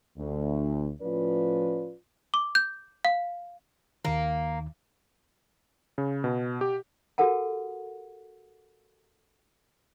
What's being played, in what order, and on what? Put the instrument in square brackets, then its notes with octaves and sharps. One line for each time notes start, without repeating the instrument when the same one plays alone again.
[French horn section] D2
A2 F3 C#4 F4 B4 D5
[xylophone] D6
G6
F5
[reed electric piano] D#2 D#3 [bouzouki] A#3
[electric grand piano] C#3
B2
G4
[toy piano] F#4 G4 A4 A#4 F#5 A5